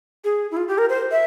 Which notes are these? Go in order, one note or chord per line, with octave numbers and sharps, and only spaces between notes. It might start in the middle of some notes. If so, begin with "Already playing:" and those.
G#4
E4
F4
G4
A#4
C5
E5